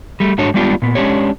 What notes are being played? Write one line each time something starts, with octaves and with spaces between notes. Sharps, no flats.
G3 A3
G#2 A3 D4 F#4 C#5
G3 G#3 B3 D4 F4 G4
A#2 B3
G#3 C#4 D4 G4 C#5